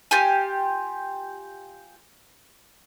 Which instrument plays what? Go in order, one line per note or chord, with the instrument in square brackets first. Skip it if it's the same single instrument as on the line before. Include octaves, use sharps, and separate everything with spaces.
[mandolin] F4 G4 G#5